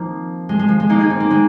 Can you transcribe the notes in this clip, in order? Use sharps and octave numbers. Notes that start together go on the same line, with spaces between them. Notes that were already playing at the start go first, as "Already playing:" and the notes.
Already playing: F3 A#3 C4 D#4
G#3
G#3
F3
G#3
A#3 D#4
D#4 G#4
C4
A#3
G#3 C4